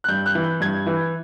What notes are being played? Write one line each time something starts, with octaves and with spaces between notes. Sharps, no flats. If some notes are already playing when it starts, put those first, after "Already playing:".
F#6
G2 G6
F#6
E3
G6
G2 G#6
E3